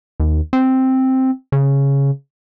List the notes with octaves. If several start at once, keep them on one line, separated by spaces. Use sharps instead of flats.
D#2
C4
C#3